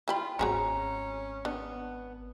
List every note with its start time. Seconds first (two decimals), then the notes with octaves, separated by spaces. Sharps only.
0.08 E3 F4 G4 B5
0.39 G#1 C4 C#4 F#4 G#4 C5 A#5
1.45 B3 D4